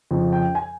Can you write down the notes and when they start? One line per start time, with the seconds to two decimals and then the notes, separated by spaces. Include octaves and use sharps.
0.11 F2 C#3 F3
0.33 G5
0.55 G#5